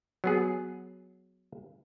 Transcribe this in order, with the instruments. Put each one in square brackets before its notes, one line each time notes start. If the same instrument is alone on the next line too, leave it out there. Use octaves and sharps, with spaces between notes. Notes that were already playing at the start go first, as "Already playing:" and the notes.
[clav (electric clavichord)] F#3 B3 G#4